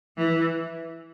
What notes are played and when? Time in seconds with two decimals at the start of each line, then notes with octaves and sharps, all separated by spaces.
0.18 E3